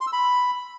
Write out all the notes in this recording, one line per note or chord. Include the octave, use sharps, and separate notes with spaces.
C6
E6
B5